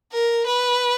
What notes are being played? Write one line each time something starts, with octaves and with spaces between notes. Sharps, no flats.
A#4
B4